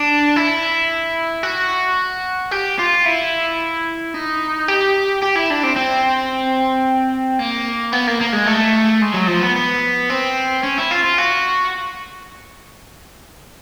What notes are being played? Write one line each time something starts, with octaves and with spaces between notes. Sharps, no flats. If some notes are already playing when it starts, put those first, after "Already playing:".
Already playing: D4
E4
F#4
G4
F4
E4
D#4
G4
G4
E4
D4
C4
C4
A#3
B3
A#3
A#3
G#3
A3
G#3
F#3
F3
B3
B3
C4
C#4
E4
F4
F4
F#4